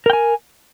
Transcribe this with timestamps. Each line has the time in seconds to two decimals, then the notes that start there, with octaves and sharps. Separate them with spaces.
0.06 A#4
0.10 G5
0.13 G#5